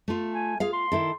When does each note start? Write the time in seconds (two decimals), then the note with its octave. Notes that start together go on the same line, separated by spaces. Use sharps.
0.08 A3 F4
0.34 G#5
0.60 F4 G#4 F5
0.73 C6
0.92 D#3 E4 A4